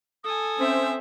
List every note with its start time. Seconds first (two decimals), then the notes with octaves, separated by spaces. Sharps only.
0.24 A4 G#5 D#6
0.59 C4 C#4 C5 E5